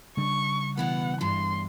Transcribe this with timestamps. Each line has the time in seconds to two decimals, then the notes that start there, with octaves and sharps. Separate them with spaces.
0.17 C#3 G3 D4 C#6
0.77 B2 E3 B3 F#5
1.21 E2 G2 E3 C6